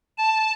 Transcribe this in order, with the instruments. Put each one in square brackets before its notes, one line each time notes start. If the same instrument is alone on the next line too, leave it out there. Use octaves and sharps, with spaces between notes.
[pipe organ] A5